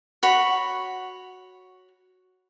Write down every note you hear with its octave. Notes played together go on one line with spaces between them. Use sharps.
F#4 C#5 B5